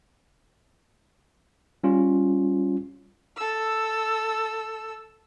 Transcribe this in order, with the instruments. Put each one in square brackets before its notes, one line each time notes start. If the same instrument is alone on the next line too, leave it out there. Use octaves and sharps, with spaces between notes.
[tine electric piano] G3 C#4 F4
[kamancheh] A4 E6